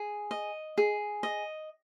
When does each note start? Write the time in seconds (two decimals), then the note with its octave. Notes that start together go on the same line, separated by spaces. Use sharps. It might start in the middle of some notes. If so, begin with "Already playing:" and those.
Already playing: G#4
0.31 D#5
0.78 G#4
1.23 D#5